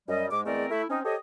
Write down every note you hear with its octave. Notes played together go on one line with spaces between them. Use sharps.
F#2 G3 D#5
G#2 G#3 D6
E2 G#3 A3 C4 A#4 D5
A3 E4
C4 C#4 D#4
G4 A4 C5 C#5 D#5